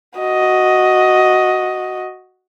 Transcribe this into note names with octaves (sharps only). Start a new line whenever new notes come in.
F#4 D#5